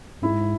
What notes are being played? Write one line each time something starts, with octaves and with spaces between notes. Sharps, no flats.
G#2 E4